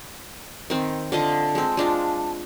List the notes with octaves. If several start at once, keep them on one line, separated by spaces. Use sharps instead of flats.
D#3 C4
D3 F4 D#5 A5
G#3 C4
G#3 D4 F4